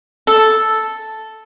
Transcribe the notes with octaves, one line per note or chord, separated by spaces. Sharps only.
A4